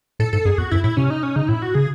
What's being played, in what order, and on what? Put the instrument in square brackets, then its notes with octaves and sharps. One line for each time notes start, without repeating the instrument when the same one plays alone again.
[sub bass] A2 [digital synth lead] A4
[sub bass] G#2 [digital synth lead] A4
[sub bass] F#2 [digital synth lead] G#4
[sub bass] E2 [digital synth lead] F#4
[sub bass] F#2 [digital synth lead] E4
[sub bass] A2 [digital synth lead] E4
[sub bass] C3 [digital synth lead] C#4
[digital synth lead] D#4
C#4
[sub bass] C#3 [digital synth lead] D#4
[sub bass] A2 [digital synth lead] E4
[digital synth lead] F#4
[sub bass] C#3 [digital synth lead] G#4